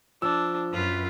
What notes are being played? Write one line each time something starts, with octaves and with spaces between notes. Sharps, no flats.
F3 D4 E6
F#2 F4 B4